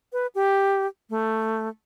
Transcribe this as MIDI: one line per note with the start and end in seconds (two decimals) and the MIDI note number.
0.13 0.27 71
0.35 0.87 67
1.10 1.68 57